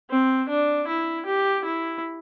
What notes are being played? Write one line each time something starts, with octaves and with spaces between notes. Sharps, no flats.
C4
D4
E4
G4
E4